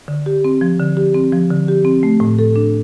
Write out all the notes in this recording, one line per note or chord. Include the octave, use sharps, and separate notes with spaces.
D3
G4
C4
F3
D3
G4
C4
F3
D3
G4
C4
A3
A2
A4
D4